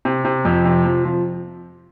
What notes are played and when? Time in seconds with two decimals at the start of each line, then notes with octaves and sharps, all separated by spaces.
0.05 C3
0.25 C3
0.45 F2
0.65 C3
0.85 F3
1.05 F3